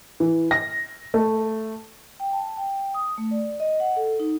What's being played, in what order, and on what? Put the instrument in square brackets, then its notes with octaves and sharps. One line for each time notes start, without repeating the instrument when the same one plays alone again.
[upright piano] E3
A#6
A3
[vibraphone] G5
A5
G5
D#6
A3
D5
D#5
F#5
A4
D#4